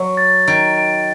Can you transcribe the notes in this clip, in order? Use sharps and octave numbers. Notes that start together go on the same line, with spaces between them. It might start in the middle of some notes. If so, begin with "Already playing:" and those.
Already playing: F#3
A6
D#3 D7
D7